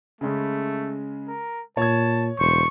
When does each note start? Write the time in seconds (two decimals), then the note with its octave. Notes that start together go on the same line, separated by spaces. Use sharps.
0.21 C#3 G#3 A3 C#4
1.28 A#4
1.77 A#2 C#5 A5 G#6
2.39 E1 C5 C#6